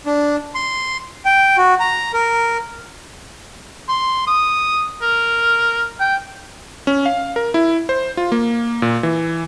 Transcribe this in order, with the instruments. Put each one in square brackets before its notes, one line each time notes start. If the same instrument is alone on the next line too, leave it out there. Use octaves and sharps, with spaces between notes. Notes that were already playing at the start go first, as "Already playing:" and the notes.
[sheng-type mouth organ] D4
C6
G5
F#4
A#5
A#4
[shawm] C6
D#6
A#4
G5
[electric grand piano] C#4
F5
A#4
E4
C5
F4
A#3
A#2
E3